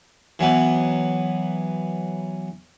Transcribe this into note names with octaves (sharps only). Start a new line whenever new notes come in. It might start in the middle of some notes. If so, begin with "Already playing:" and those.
E3 F#3 B3